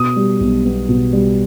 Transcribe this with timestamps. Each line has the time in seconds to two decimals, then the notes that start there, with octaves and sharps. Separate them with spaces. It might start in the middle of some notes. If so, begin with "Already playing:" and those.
Already playing: B2 D#6
0.16 G3
0.41 B1
0.65 B3
0.89 B2
1.13 G3